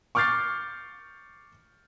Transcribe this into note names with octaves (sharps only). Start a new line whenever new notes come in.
C#6 D6 F6 G6 A6 C7